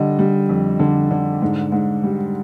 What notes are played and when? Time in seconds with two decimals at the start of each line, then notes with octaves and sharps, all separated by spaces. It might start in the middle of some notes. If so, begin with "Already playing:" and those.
Already playing: D3 G3 D#5
0.19 G3
0.49 F2
0.80 D3
1.11 D3
1.42 G#2
1.72 G#2
2.04 G3